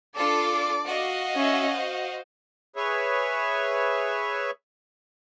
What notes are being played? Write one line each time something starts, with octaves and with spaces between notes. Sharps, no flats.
D4 F4 A4 D5 D6
F#4 D#5 F5
C#4 E5
C5
G#4 B4 C#5 E5